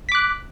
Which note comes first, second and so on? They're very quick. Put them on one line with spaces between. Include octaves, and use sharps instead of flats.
B6 D6 F#6